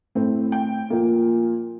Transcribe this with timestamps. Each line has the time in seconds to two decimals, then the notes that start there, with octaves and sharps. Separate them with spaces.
0.15 A2 A3 C4
0.52 G5
0.90 A#2 F3 A#3